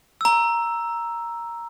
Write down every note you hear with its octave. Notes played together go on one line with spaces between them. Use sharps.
A#5 E6